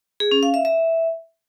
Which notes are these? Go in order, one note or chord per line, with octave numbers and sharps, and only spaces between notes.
G#4
C#4
F5
E5
E5